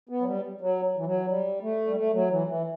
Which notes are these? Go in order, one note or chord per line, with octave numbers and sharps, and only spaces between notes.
B3
F#3
G3
F#3
E3
F#3
G3
A3
G3
A3
F#3
E3
E3